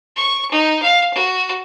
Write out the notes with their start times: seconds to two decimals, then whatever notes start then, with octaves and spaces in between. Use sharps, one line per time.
0.16 C#6
0.51 D#4
0.82 F5
1.13 F#4